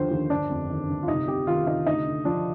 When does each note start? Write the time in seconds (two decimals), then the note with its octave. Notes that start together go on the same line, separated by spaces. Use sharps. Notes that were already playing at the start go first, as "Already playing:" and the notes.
Already playing: D#2 D3 F3 C5
0.11 D#2
0.30 G1 D4
0.50 F2
0.70 D#3
0.88 G1
1.03 F4
1.08 C2 D#4
1.28 C3 G4
1.47 D#3 F4
1.67 C2 D#4
1.86 D2 D#4
2.06 D3
2.25 F3 D4